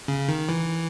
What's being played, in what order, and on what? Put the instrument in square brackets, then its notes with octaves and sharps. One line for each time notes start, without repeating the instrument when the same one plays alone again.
[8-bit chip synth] C#3
D#3
E3